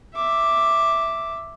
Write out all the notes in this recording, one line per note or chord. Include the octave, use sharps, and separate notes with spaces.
E5 D6